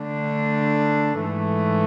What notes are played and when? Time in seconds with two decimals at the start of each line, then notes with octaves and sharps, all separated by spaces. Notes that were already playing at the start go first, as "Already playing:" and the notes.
Already playing: D3 A3 D4
1.22 G#2 E3 A3